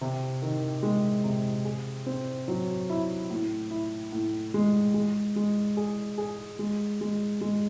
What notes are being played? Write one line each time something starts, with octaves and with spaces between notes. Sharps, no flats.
C3
D#3
G#3
C3
G#4
C4
F#3
E4
A2
E4
A2
G#3
G#3
G#3
G#4
G#4
G#3
G#3
G#3